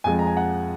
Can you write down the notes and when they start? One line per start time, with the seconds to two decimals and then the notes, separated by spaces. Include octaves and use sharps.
0.04 F2 F3 G#3 G#5
0.19 A#5
0.27 G#5
0.37 F#5